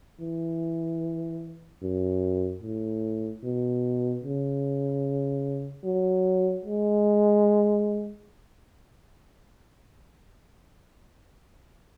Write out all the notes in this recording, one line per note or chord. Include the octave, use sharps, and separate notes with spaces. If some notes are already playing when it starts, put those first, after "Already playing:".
E3
F#2
A2
B2
C#3
F#3
G#3